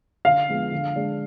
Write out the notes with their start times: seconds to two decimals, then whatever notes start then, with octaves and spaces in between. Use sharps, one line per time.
0.25 D3 F5
0.49 F3 G#3 B3 D4
0.72 D3
0.96 G#3 D4